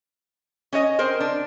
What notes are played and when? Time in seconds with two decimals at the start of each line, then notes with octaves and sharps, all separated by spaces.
0.73 C#4 C#5 D#5
0.99 C4 A#4 C5
1.20 D4